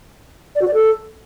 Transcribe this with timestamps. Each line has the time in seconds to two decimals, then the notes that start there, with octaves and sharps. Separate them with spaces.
0.55 D5
0.61 F#4
0.68 D5
0.74 A4